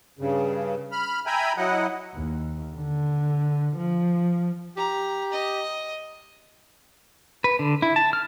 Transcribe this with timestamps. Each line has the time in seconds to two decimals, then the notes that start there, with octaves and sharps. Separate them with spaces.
0.19 G2 C#3
0.92 B5 F6
1.26 E5 G5 G#5 A#5 B5
1.57 F#3 E4 D#5 F#5
2.15 D#2
2.75 D3
3.77 F3
4.77 G4 A#5
5.32 D#5
7.44 B4
7.59 D3
7.82 E4
7.96 A5
8.13 F6